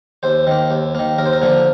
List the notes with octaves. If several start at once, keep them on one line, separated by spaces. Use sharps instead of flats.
D#2 C5
D#3 A#3
D#2
D#3 A#3
D#2 A#4
C5
A#4
D3 F3 A#3